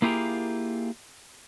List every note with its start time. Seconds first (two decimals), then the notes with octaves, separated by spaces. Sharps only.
0.02 A#3 E4 F4 G4 G#4 A#4